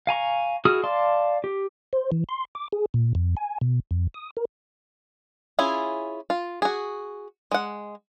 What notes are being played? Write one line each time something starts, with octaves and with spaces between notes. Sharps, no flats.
F5 G#5 A#5 C#6
E4 F#4 G#4 D#6 F6
D5 F5 A5 C6
G4
C5
E3
C6
D6
G#4
A#2
F2
G#5
B2
F2
D#6
A#4
C#4 E4 F4 G#4
F4
F#4 G#4
G#3 F#5